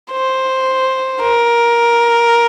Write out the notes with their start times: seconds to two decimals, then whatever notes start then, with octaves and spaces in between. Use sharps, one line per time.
0.12 C5
1.22 A#4